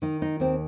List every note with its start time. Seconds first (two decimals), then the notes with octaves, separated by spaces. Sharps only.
0.02 D#3 D#4
0.22 D#4
0.40 D#2 C4